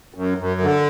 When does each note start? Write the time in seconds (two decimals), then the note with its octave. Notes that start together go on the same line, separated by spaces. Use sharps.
0.14 F#2
0.38 F#2
0.61 D3